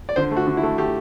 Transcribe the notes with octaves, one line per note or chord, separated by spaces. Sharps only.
D5
D3 C5
A3
F#4
D3
E4
A3
A3 G4